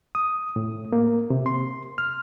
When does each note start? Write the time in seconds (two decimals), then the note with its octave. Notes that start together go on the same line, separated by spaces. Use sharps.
0.15 D#6
0.56 A2
0.92 A#3
1.30 C3
1.46 C6
1.98 F6